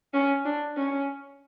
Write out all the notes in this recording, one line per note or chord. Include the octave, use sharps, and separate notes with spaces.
C#4
D4
C#4